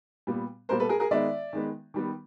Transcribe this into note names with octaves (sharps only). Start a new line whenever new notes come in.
A#2 G3 B3
A#2 G3 B3 A#4 C5
A4 B4
G#4 A#4
G#4 A#4
D#3 G#3 B3 D5 E5
D#3 G#3 B3
D#3 G3 B3